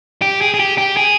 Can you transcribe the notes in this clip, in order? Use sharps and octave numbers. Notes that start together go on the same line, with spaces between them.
G4
G#4
G#4
G4
G4
G#4